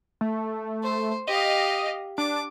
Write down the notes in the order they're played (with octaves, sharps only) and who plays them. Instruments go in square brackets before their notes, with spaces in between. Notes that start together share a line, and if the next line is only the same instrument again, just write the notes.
[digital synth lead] A3
[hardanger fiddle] C5
[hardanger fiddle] G4 F5 [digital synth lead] D#5
[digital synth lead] D4 [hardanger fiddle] D6